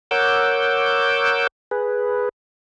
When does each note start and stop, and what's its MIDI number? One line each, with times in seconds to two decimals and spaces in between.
0.11 1.47 70
0.11 1.47 73
0.11 1.47 78
0.11 1.47 86
0.11 1.47 88
0.11 1.47 91
1.71 2.29 68
1.71 2.29 71